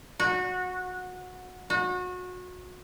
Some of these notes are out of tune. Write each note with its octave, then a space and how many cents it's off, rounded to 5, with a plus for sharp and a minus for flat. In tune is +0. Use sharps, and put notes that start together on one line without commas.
F#4 -20
F#4 -30